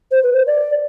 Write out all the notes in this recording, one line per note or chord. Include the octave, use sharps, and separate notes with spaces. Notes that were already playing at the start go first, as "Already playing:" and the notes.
C5
B4
C5
D5